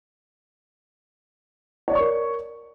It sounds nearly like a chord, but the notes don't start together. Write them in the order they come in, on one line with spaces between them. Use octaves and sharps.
C#5 D5 C#6 A#4